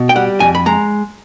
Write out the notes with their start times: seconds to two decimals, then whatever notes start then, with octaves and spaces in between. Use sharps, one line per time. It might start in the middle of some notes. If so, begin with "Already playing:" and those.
Already playing: B2
0.09 G5
0.16 G3 F#5
0.40 F2 G#5
0.55 B5
0.66 G#3 A#5